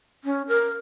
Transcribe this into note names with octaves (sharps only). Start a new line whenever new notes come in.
C#4
A#4